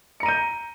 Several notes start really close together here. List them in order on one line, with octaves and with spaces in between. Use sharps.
C#7 A#5 D#7 G6